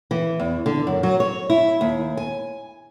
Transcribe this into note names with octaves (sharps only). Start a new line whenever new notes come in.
E3
E2
D3
F#2
F#3
C#5
E4
D#2
G#5